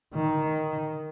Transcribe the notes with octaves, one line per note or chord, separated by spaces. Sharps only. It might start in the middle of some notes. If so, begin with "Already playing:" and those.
D#3